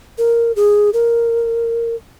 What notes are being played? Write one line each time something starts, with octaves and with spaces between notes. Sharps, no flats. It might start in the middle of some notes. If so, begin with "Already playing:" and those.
A#4
G#4
A#4